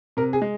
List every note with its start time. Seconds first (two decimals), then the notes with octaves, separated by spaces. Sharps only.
0.17 C3 A#4
0.33 G#4
0.42 G#3